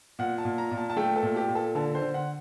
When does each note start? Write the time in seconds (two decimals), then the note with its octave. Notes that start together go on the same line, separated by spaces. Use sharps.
0.19 A#2 F#5
0.38 A5
0.45 A#2
0.58 A#5
0.71 A#2
0.77 A5
0.90 A5
0.97 A3 G5
1.16 A4
1.23 A#2
1.36 G4
1.49 A#2
1.55 A4
1.75 D3 A4
1.95 C5
2.02 D3
2.14 F#5